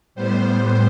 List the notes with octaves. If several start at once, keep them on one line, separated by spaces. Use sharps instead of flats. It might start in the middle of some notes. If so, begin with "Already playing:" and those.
A2 G3 B3 C5